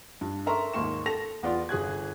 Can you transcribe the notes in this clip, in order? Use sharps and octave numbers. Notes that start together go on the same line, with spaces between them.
G2
A4 A#4 E5 A#5 C6 C#6
D#2 G#2 A#3 C6 C#6 E7
A4 A#6 F7
E2 B3 F4 D5 C6
G1 G#4 F#6 G#6